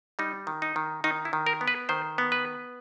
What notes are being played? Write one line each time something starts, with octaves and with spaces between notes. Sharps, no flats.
G3 D#4
D#3
D#4
D#3
D#3 D#4
E4
D#3
A#4
B3
B4
D#3 C5
B3
B4